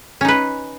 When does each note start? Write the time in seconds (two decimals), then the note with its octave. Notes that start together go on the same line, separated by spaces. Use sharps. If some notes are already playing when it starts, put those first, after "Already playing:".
0.21 C#4
0.25 D#4
0.28 B4